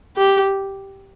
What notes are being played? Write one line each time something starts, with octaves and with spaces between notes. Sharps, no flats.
G4